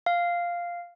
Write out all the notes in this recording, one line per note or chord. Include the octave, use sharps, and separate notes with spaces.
F5